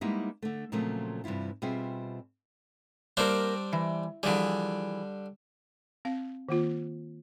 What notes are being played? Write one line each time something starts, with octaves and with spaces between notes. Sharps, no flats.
G3 G#3 A#3 B3 D#4 E4
D3 A3
A#2 C#3 F3 F#3 A3 C4
G2 C3 E3 E4 F4
B2 G3 C4 F4 G#4 E5
G3 A#3 C4 D4 A#4
E3
D3 E3 F3 G3 G#4
C4 F5
D#3 A#3 F4